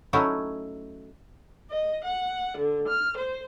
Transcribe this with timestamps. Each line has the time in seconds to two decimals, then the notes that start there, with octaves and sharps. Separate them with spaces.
0.13 F#3 A3 C#4 D#4 E4 F#4
1.70 D#5
2.05 F#5
2.57 D3
2.87 F6
3.17 C5